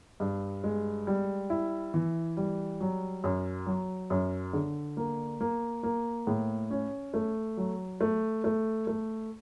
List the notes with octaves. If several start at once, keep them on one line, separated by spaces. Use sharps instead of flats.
G2
G#3
G3
E4
E3
G3
F#3
F#2
F#3
F#2
D3
A#3
A#3
A#3
A2
C#4
A3
F#3
A3
A3
A3